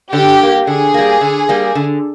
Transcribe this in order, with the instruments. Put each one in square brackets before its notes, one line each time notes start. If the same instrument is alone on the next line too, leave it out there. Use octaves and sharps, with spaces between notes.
[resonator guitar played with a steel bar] D3 [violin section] G4
[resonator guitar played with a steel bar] G3 A#3
[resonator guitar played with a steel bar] D3 [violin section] G#4
[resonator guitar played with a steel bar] G3 A#3
D3
G3 A#3
D3